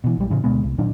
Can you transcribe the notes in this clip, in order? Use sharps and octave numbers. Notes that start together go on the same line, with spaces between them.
B2 E3
A#1 G3
A2 C#3 E3
D2 B2 G#3 B3
C2
A#2 D#3 F#3 D4